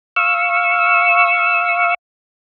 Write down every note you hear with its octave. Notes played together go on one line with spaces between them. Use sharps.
F5 C#6 E6